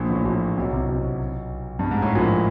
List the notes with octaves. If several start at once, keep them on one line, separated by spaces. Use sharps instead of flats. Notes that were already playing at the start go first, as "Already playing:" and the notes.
Already playing: A#1 A#2
A1 A2
A#1 A#2
B1 B2
C2 C3
B1 B2
G2
G#2
A2
A#1 A#2